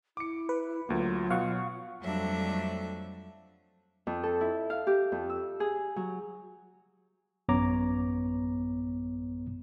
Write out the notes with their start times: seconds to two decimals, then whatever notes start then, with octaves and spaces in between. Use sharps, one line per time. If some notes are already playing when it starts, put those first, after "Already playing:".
0.17 E4 D6 C#7
0.49 B4
0.89 D2 F#3 A#3 F4
1.30 B2 F5 F#5 C#6
2.03 F2 F#3 G3 A3 D4 E5
4.07 F2
4.23 A4
4.41 E4
4.70 F5
4.87 G4
5.12 F2
5.30 E6
5.60 G#4
5.96 F#3
7.49 A1 F#2 B3 C#5 A#5 D6